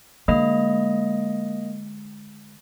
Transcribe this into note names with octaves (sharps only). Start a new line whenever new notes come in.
D3 G#3 A#3 D#5